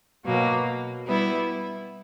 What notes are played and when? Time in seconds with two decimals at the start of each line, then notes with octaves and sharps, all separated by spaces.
0.25 B2 F#3 A#3
1.05 G3 B3 E4